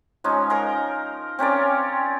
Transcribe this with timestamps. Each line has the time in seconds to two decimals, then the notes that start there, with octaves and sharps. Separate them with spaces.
0.24 F3 G#3 C#4 D#4
0.50 A#4 A#5 C6
1.39 C4 C#4 A#4 D5